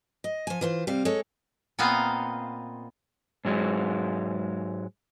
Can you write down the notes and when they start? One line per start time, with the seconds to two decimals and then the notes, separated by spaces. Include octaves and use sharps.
0.24 D#5
0.47 F3 G#5
0.61 E3 F4 C5
0.87 C3 G3 F5
1.05 G#3 A4 C#5
1.79 A#2 B3 C4 D#5 F5
3.45 G#2 F#3 G#3